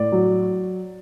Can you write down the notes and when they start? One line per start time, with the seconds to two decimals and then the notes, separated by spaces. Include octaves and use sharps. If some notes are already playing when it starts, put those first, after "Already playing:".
Already playing: A2 D5
0.12 F#3